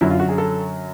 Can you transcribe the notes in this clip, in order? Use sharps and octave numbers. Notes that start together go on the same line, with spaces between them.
F#2 D3 F#3 E4
F4
F#4
G#4
A4